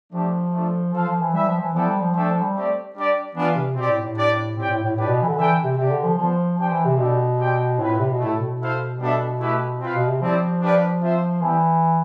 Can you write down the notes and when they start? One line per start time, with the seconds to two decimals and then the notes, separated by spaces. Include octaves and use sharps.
0.13 F3 A3 D4 G4
0.53 A3 D4 F4 A4
0.93 F3 F4 A4 C5 F5
1.07 F3
1.20 E3
1.33 G3 E4 B4 E5
1.47 F3
1.61 E3
1.74 F3 B3 E4 A4 D5 G5
1.87 G3
2.00 F3
2.14 F3 A3 D4 A4 E5 G5
2.28 F3
2.41 G3
2.55 A3 C4 G4 D5
2.95 G3 D4 G4 D5
3.34 E3 B3 D4 F4 B4 F5
3.55 C3
3.75 B2 C4 G4 D5
3.89 A2
4.02 A2
4.16 D4 G4 D5
4.56 A2 C4 G4 D5 G5
4.69 A2
4.83 A2
4.96 A2 D4 G4 B4 D5
5.06 B2
5.22 E3
5.27 D3
5.37 E3 D4 A4 E5 G5
5.63 C3
5.77 C3 D4 G4 D5 G5
5.90 D3
6.03 F3
6.17 F3 G3 B3 F4 C5
6.58 F3 D4 G4 C5 G5
6.71 E3
6.85 C3
6.97 B2 B3 D4 A4 D5 G5
7.38 C4 G4 D5 G5
7.79 A2 C4 F4 B4
7.99 C3
8.11 B2
8.19 A2 A3 E4 A4
8.37 B2
8.59 E4 A4 C5 F5
8.99 B2 G3 B3 D4 A4 E5
9.40 A3 E4 G4 B4 E5
9.79 C4 F4 B4 F5
9.93 B2
10.07 C3
10.20 F3 G3 C4 E4 G4 D5
10.61 D4 G4 B4 D5 F5
11.01 C4 F4 C5 E5
11.41 E3 G3 B3 E4 G4